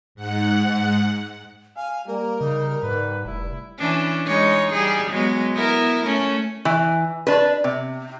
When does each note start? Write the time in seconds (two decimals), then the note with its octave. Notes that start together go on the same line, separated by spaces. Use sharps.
0.15 G#2 F#5
1.77 F5 G#5
2.08 G3 A#3 A#4
2.41 C#3 D#4
2.83 G#2 B4
3.26 F1 E4
3.78 E3 C#4 D4
4.26 G#3 D#4 C#5
4.73 G3 G#4
5.11 F#3 G#3 B3
5.54 B3 E4 A#4
6.05 A3 C#4
6.65 E3
7.27 D4 B4
7.64 C3